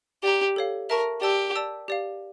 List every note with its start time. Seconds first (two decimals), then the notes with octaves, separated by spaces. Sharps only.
0.24 G4 D5 G5 A#5
0.56 A4 C#5 F5
0.90 A#4 E5 A5 C#6
1.22 G4 D5 A5 E6
1.56 D5 A5 E6
1.88 G4 D5 F5